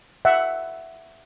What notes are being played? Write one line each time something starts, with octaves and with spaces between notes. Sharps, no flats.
E5 F#5